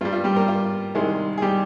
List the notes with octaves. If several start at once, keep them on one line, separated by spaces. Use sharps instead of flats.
G2 G3 F4
F4
G3 G4
A#3 A#4
F4
C2 C3 D#3 G#3
G#4
G3 G4